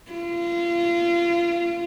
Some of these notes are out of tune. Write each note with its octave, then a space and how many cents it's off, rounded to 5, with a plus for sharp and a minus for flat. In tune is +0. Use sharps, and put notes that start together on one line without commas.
F4 -30